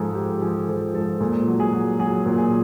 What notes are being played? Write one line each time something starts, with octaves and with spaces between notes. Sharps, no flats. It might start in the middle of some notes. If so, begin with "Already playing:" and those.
Already playing: G#2 F3 G#4 A4
G#2 G4
F3 G#4
F3 A4
G#2 A4
A#2 G#4
F#3
G#4
F#3
F#3 G#4
A#2
G#4